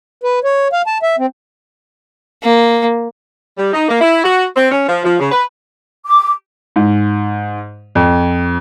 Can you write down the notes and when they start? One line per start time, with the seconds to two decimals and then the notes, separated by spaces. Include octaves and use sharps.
0.23 B4
0.44 C#5
0.73 F5
0.87 A5
1.03 E5
1.19 C4
2.43 A#3
3.58 G3
3.73 D#4
3.89 A#3
4.01 E4
4.24 F#4
4.57 C4
4.72 C#4
4.88 F3
5.05 F3
5.19 C#3
5.32 B4
6.07 D6
6.76 G#2
7.95 F2